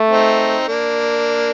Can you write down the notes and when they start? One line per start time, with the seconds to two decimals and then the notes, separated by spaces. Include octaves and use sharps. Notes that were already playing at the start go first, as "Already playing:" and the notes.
Already playing: A3
0.09 C4 D#4
0.68 A#3 D4